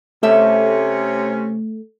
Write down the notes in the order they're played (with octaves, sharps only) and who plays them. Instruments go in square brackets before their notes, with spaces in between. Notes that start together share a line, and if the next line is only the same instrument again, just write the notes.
[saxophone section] C3 C#4 [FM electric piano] A3 [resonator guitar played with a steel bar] G4 E5